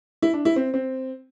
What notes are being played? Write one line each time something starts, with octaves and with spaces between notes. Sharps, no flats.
E4
D4
E4
C4
C4